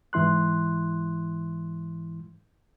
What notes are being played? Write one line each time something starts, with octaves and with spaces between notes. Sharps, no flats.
G#2 E3 E4 C6 F#6